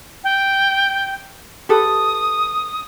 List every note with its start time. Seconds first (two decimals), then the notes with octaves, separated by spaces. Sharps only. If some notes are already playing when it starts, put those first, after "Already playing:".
0.24 G5
1.69 G4 A4 B4 D#6